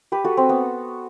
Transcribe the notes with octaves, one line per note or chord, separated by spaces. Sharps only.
G4 B4
F#4 A4
C4
B3